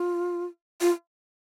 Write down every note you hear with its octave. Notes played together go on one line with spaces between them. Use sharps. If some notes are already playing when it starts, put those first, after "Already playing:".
Already playing: F4
F4